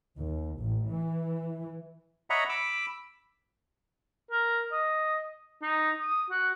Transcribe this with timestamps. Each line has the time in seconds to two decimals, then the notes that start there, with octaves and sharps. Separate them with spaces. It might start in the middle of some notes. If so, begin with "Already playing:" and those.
0.18 D#2
0.58 A1
0.90 E3
2.30 C#5 D#5 E5 F#5 A#5 B5
2.49 B5 D6 E6
4.31 A#4
4.72 D#5
5.62 D#4
6.00 D#6
6.31 F#4